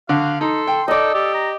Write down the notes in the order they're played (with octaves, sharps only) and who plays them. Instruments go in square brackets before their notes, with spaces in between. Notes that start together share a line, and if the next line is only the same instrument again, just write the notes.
[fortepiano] D3 [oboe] F#4 [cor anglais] F5
[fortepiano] D#4 [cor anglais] A4 [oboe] C6
[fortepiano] G5
[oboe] D#4 [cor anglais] A4 [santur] D5 D#5
[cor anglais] G4 [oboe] A4
[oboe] A#5